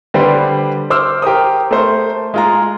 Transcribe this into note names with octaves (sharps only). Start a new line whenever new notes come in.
D3 G3 G4 B4 C5
C5 D6 E6 F6
G4 A#4 C5 D#6
A3 A#4 C5
G#3 F4 A#5